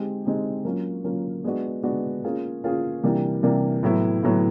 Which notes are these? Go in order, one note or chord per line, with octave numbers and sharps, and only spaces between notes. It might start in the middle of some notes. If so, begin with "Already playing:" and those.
Already playing: G#3 C4 D#4 G4
G#3 C4 D#4 G4
F#3 A#3 C#4 F4
F#3 A#3 C#4 F4
G#3 B3 D4 F#4
G#3 B3 D4 F#4
A#3 C#4 F4 G#4
A#3 C#4 F4 G#4
C3 E3 G3 A#3 D4
C3 E3 G3 A#3 D4
A2 F#3 B3 E4
A2 F#3 B3 E4